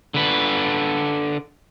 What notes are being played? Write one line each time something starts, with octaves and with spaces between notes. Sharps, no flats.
D3 B4